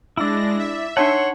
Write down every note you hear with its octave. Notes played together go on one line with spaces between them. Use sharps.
G#3 D4 E4 D5 A#6
E5
D4 D#4 C#5 F#5 A5 C6